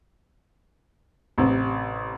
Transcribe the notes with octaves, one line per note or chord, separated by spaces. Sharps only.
A1 C3